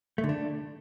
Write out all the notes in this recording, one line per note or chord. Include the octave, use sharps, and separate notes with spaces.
A3
D3
D4